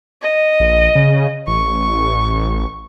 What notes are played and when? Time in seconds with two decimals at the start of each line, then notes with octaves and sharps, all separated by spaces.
0.22 D#5
0.60 A#1
0.95 C#3
1.47 A1 C#6